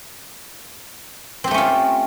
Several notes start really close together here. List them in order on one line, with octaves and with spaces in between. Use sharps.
C4 G4 A3 C#4 F4